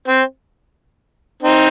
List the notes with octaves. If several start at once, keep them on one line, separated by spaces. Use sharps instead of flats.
C4
C4 D#4